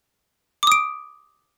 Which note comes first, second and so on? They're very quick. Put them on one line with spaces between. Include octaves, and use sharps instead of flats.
D6 D#6 D7